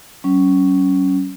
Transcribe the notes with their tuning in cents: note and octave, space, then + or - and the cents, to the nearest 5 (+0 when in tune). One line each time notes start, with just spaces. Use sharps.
F#3 +45 C#4 +0